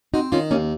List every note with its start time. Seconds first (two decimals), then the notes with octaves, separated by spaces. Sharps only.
0.14 C4 D#4 F#4
0.32 D#3 C#4 F4
0.51 D#2 A#3 C#4